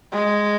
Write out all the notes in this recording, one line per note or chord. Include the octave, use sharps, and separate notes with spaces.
G#3